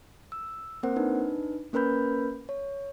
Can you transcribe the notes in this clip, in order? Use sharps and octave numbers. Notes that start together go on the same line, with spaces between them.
E6
A#3 C4 A#4 C5 F#5
D4 D#4 B4
A#3 C#4 A#4 B4 B5 G6
C#5